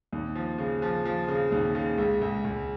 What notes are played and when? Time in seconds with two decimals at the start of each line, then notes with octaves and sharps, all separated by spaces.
0.13 D#2
0.35 F3
0.58 C#3
0.82 F3
1.05 F3
1.28 C#3
1.52 D#2
1.75 C#3
1.98 C#2
2.22 C#2
2.44 C#2